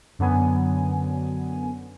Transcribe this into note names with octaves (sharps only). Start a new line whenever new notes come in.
F#2 D3 F#3 B3 G#5